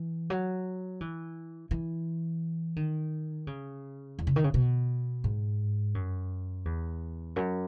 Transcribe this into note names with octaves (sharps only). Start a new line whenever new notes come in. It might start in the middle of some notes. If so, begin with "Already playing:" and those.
Already playing: E3
F#3
E3
E3
D#3
C#3
E2
C#3
D#3
C#3
B2
G#2
F#2
E2
F#2